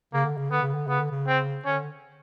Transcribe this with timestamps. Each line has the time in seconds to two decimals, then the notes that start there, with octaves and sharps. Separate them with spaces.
0.14 C#3 A#3
0.25 D3
0.37 C#3
0.50 D3 B3
0.62 C#3
0.74 D3
0.87 C#3 B3
1.00 D3
1.11 C#3
1.27 C4
1.65 D3 C#4